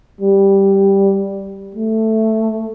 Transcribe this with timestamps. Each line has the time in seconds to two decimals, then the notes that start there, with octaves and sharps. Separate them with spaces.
0.21 G3
1.75 A3